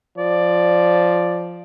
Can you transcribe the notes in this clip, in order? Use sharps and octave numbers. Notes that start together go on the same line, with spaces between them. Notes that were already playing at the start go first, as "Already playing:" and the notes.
F3 D5